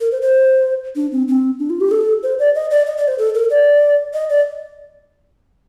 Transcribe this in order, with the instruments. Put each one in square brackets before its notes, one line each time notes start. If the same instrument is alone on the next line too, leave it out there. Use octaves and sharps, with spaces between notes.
[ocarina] A#4
C5
C5
D4
C4
C4
D4
F4
G4
A4
C5
D5
D#5
D5
D#5
D5
C5
A4
A#4
D5
D#5
D5